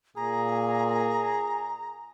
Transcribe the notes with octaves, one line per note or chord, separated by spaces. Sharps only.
A#2 G#4 A#5